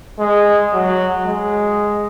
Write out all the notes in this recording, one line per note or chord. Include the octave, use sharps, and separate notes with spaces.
G#3
F#3
G#3